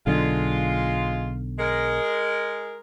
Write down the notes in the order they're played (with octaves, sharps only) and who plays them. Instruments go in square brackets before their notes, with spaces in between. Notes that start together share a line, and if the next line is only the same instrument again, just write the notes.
[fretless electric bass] B1 D3 [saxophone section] G#3 F4
[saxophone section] G#3 A#4